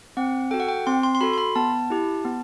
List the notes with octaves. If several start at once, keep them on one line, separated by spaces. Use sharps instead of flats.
C4 F#5
F#4 A4 G5
F#5
G5
C4 C6
C6
C6
F#4 A4 B5
C6
B5
B3 A5
E4 G4
B3